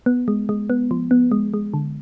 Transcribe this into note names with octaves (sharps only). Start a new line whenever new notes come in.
B3
G#3
G#3
B3
F3
B3
G#3
G#3
D3